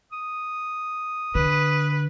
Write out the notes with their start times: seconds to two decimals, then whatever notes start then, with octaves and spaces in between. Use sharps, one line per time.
0.12 D#6
1.35 D3 B4